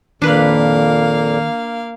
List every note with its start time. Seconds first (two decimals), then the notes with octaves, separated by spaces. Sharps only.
0.22 F2 A#2 D#3 A#3 D4 B4 F5